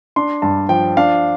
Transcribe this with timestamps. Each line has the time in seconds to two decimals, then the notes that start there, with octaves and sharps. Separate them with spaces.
0.16 D4 C6
0.42 G2 A5
0.69 F3 G5
0.97 D4 F5